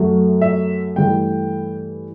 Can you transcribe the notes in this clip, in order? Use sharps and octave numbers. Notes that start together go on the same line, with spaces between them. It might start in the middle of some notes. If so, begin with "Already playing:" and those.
Already playing: F#2 F#3 A3
E5
G2 E3 A3 G5